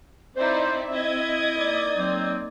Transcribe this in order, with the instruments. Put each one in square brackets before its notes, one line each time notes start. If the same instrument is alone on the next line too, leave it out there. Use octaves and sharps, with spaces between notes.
[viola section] C4 E5 [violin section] D#4 E4 D5 [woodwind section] C5
[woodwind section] E4 [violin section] D#5 D#6 G#6
[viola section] A#3 D#4 D5
[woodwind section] F#3 C4